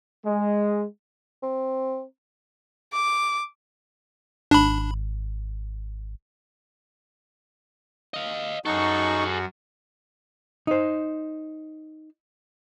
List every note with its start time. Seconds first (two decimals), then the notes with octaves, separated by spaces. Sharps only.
0.24 G#3
1.43 C4
2.94 D6
4.51 G#1 D4 B5
8.14 D#5 F5
8.65 F#2 D#4 F#4 G#4 A4 C#6
10.67 D#4 C5